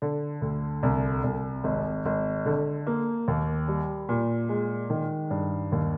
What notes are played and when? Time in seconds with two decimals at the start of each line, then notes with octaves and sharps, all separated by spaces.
0.02 D3
0.42 D2
0.83 C2
1.24 C2
1.64 G#1
2.06 G#1
2.46 D3
2.87 A#3
3.28 D#2
3.68 G3
4.09 A#2
4.49 G#3
4.90 D#3
5.30 G2
5.72 D#2